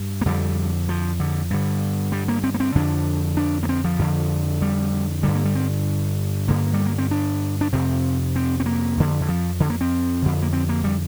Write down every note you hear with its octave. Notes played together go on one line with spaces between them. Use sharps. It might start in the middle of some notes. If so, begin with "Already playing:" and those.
Already playing: G2
A#3
F2 D3 G3
F3
D3
G2 D3
G3
A#3
C4
A#3
C4
F2 D3 D4
D4
A#3
C4
F3
F2 D3
G3
G2 D3 G3
A#3
G3
C4
G2 D3 A#3
G3
A#3
C4
D4
D4
F2 C3 C4
C4
C4
A#3
F2 D3
D3
F3
D3
A#3
C4
F2 D3
A#3
C4
A#3
G3